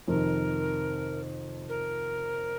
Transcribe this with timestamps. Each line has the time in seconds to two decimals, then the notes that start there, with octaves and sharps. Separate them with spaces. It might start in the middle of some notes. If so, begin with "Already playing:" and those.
0.08 F2 C3 D#3 A#4
1.69 A#4